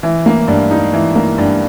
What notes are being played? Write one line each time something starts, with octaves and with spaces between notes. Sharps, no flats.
E3
A#3
G2
D#4
E3
A#3
G2